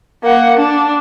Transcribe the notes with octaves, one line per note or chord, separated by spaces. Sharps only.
A#3 F#5
D4